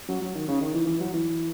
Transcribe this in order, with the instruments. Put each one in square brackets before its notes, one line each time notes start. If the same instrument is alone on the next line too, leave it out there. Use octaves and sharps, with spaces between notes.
[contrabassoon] F#3
F#3
D#3
C#3
D#3
E3
E3
F#3
E3